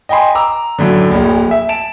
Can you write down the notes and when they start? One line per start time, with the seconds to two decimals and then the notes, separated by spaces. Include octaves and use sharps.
0.09 D#5 G5 G#5 B5 C6
0.35 A#5 D6 E6
0.79 F#2 A2 D3
1.09 D1 A#1 A2
1.51 E5
1.69 A5 D7 E7